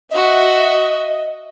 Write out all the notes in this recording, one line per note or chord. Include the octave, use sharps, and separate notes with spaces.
F#4 D#5 E5